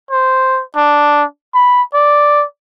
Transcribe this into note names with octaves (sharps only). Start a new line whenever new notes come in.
C5
D4
B5
D5